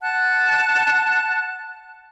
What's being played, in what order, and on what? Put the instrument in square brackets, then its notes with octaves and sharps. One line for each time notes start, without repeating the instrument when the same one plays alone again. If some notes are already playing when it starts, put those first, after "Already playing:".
[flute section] F#5 A5 F#6